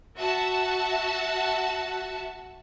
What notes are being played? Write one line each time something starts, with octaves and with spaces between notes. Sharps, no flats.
F#4 E5 F#5 A5